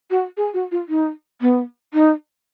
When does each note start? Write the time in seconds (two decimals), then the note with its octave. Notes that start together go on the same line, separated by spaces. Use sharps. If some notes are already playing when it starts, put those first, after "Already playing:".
0.11 F#4
0.37 G#4
0.54 F#4
0.72 F4
0.89 D#4
1.41 B3
1.94 D#4